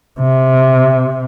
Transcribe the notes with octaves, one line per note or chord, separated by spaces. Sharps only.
C3